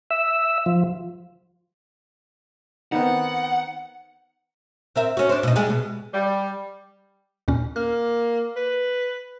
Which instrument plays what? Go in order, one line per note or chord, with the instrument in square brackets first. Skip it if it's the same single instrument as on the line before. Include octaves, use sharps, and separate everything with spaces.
[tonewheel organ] E5
F3
[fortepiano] D#3 B3 C4 [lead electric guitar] F#5
[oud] C4 A#4 E5
C#4 F#4
D4 C5
B2 D#4
G3 G#3 G#4
B2
[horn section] G3
[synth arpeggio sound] D#2 A#2 C#4
[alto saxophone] A#3 [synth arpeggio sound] F6
[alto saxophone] B4